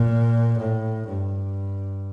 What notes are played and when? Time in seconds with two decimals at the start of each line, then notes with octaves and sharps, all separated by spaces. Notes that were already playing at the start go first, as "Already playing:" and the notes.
Already playing: A#2
0.59 A2
1.08 G2